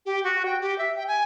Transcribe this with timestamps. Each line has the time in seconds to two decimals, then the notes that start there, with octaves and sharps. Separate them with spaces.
0.05 G4
0.23 F#4
0.45 G5
0.61 G4
0.78 E5
0.96 G5
1.07 G#5